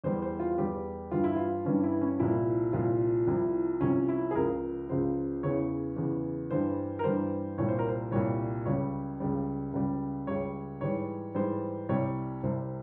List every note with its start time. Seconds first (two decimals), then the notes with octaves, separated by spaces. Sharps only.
0.04 E2 E3 G3 C5
0.22 C5
0.40 F4
0.58 E2 E3 G3 G4
1.11 G2 E3 G3 F4
1.24 E4
1.36 F4
1.65 G2 E3 G3 C#4
1.84 E4
2.01 C#4
2.19 C2 A#2 F3 E4
2.73 C2 A#2 F3 F4
3.27 C2 C3 F3 E4
3.81 C2 C3 F3 C#4
4.09 E4
4.31 G#4
4.34 C#2 C#3 F3 A#4
4.88 C#2 C#3 F3 C5
5.43 E2 C#3 E3 C#5
5.96 E2 C#3 E3
6.51 G2 E3 G3 C5
6.99 A#4
7.04 G2 E3 G3 C5
7.58 C2 A#2 G3 C#5
7.69 C5
7.79 A#4
7.89 C5
8.11 C2 A#2 G3 C#5
8.66 C#2 C#3 G3 C#5
9.20 C#2 C#3 G3
9.73 C#2 C#3 G3
10.27 C#2 C#3 G3 C#5
10.81 G#2 E3 G3 C#5
11.35 G#2 E3 G3 C5
11.89 C2 C3 G3 C#5
12.43 C2 C3 G3 C5